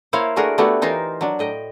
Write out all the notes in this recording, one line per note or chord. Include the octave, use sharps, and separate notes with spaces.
A#3 E4 A#4 C5 C#5 F5
A3 D4 F#4 G#4 A#4
A3 B3 D4 E4 F#4 G4
E3 D#4 F4 A#4 C5
F#3 D4
A2 D#5 G5